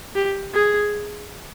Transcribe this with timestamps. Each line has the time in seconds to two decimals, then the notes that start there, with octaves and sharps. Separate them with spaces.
0.15 G4
0.54 G#4